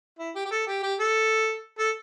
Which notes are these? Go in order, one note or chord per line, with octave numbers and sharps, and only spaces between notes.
E4
G4
G4
A4
G4
G4
A4
A4